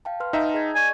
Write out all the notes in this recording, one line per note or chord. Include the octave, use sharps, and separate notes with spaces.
F5 G5 A5
B4 C6 F6
D#4 E5 G5 A5 A#5
G#4 D#5 G#6
D5 D#5 G#5 C#6